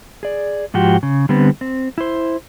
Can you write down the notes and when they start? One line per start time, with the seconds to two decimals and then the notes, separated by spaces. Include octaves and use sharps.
0.23 G#4 D5
0.74 G#2 F3 F#4 G4
1.03 C#3
1.29 D3 G3 B3 C4
1.61 C4
1.98 E4 C5